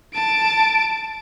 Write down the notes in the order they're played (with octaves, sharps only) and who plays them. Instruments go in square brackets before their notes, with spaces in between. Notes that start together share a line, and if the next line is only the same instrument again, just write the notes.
[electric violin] A5 D7